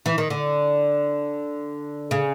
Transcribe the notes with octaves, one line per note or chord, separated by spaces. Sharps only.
E3
D#3
D3
C#3